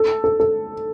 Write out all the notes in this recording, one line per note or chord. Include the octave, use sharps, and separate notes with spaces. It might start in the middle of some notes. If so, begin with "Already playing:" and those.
Already playing: A4
A4
A4